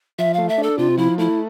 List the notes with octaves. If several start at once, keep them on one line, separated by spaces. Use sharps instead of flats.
F3 E5
A3 F5
E5
D4 A4
C3 F4
F3 E4
A3 E4